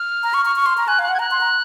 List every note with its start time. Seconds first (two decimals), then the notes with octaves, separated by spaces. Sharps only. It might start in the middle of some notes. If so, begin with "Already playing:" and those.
Already playing: F6
0.23 A#5
0.34 C#6
0.45 C#6
0.56 C#6
0.66 C6
0.77 A#5
0.87 G#5 F#6
0.99 F5
1.03 F#6
1.09 F#5
1.14 G#6
1.19 A#5 F#6
1.31 C6
1.41 A#5